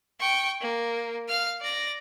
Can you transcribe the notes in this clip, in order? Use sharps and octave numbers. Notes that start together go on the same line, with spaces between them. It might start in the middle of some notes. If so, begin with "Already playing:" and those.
G5 C#6
A#3
F5 F6
D5 A#6